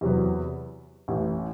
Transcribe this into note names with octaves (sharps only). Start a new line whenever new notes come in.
E2 C3 F#3 B3
A1 A2 E3